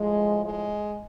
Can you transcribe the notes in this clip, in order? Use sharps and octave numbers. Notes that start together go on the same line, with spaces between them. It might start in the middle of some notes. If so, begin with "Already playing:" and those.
Already playing: A2 F3 G#3
G#3